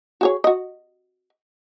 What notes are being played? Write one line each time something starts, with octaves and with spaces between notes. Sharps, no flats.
F#4 G#4 C#5
F#4 D#5